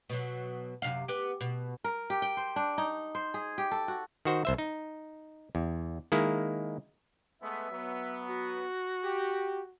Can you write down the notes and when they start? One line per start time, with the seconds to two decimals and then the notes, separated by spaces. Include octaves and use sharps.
0.10 B2 F#3
0.82 F#2 C3 F5
1.08 B3 G4
1.41 B2
1.84 A#4
2.10 G4
2.22 G5
2.37 C5
2.56 D4
2.78 D#4
3.15 C5
3.34 G#4
3.58 G4
3.71 A4
3.88 F#4
4.25 D#3 F#4 C5
4.45 C2 C5 E5
4.58 D#4
5.55 E2
6.12 D#3 G#3 A#3 E4
7.42 G#3 A3 B3 E5
7.71 F#3 B3
8.29 F#4
9.04 G4